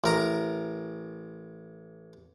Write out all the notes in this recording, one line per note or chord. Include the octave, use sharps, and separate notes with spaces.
A1 A#4 A#5